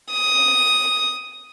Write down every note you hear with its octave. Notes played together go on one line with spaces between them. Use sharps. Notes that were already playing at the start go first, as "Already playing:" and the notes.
D#6